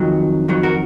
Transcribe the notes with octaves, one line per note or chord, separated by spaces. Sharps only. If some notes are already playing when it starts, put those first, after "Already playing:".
Already playing: F2 D#3 F#3
F2 D#3 F#3
F#4 A#4